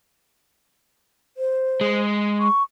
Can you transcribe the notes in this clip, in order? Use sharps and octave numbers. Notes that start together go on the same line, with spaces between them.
C5
G#3
C#6